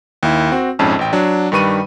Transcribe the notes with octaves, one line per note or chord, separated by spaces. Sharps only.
D#2 E4
C4 F#4
A#1 F2 G#2 C#4 A5 E6
A1 G5
F#3 D4
G2 D#3 G3 B4 C#6 D#7